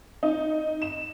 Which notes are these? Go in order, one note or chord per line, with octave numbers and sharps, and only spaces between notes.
D#4
E7